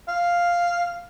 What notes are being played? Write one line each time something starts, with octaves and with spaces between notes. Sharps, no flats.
F5